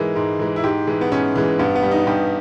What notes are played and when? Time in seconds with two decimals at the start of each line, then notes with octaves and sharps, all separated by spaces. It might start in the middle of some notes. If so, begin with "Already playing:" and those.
Already playing: G#2 E3 G#3 A#4
0.16 G#2
0.39 E3 G#3
0.56 E4
0.64 G#2 G4
0.87 E3 G#3
1.01 B3
1.12 G#2 C#4
1.35 E3 G#3
1.59 G2 B3
1.75 B3
1.83 G3
1.91 D#4
2.07 G2 G4